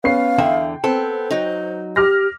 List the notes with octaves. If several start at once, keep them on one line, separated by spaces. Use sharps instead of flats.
B3 C#4 F5 C7
E2 D3 E5 G5
B3 C4 A4 C5
F#3 D#4
G4 D6 F6 A#6